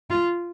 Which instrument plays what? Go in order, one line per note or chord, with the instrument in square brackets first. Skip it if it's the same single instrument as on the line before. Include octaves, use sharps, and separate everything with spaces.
[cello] F4